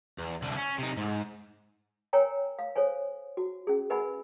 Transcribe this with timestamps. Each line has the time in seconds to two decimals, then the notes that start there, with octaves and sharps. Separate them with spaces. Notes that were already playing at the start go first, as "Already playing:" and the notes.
0.19 E2
0.42 C2 D3
0.57 C#4
0.78 C3 D#4
0.97 G#2
2.13 A#4 C#5 G5 G#5 A#5
2.59 F5
2.76 A4 C5 C#5 G#5
3.37 F#4
3.67 C#4 G#4
3.90 A#4 B4 E5 F#5 G#5 B5